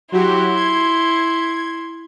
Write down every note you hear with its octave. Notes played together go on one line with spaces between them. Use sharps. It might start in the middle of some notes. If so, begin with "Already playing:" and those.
F#3 E4 F#4 G4 C6
G#6